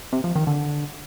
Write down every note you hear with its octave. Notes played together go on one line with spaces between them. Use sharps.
C3
F3
D#3
D3